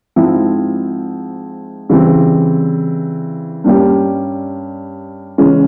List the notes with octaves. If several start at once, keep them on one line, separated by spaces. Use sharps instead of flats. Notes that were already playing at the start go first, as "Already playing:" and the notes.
G#2 F3 C4 E4
C#3 E3 G3 C4
G2 G3 A#3 C#4 G4
C#3 E3 G#3 C#4